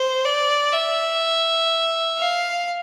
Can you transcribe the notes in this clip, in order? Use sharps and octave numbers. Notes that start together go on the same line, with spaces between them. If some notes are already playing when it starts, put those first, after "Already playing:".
Already playing: C5
D5
E5
F5